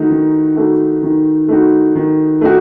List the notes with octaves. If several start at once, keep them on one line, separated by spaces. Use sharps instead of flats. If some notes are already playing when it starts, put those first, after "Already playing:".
Already playing: D#3 A3 D#4 F#4
D#3
A3 D#4 F#4
D#3
A3 D#4 F#4
D#3
A3 D#4 F#4